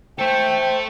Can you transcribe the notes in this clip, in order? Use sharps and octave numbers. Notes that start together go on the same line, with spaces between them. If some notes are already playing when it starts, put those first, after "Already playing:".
A4 C5 E5 G5